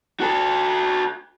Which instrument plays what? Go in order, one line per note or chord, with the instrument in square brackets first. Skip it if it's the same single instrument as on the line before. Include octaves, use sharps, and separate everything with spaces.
[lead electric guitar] F#4 A4